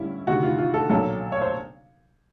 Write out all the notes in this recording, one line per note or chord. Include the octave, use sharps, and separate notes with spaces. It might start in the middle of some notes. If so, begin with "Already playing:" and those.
Already playing: G2 D3 G3 C#4 E4
D2 C3 D#3 F#4
F4
F4
A4
B1 A#2 F#3 A4
C#5
C5